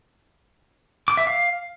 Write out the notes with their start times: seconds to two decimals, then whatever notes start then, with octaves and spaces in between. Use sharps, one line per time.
1.08 D6
1.17 E5
1.27 F5